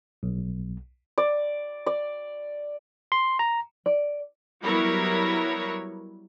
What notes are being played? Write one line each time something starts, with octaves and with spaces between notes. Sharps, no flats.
B1
D5
D5
C6
A#5
D5
F#3 G3 B3 E4 A#4 C#5